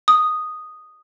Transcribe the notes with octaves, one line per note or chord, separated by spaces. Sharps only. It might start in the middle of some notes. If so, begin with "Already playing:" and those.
D#6